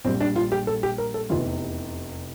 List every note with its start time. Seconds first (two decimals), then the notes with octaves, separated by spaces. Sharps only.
0.05 A#1 A#2 G3 C4
0.20 D4
0.36 F4
0.52 G4
0.67 A4
0.83 G4
0.98 A#4
1.14 A4
1.29 F1 E2 C3 F4